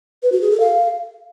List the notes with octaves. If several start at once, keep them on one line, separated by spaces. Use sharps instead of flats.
B4
F#4
G#4
A4
F5